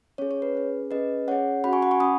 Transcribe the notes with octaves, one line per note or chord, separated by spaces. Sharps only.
C#4 G#4 C#5
C#5
B4
C#4 G#4
C#4 G#4 B4 D#5
C#4 G#4 C#5 F#5
C#4 F#4 F#5 B5
G#5 C#6
F#5 B5
G#5 C#6
C#4 B5 D#6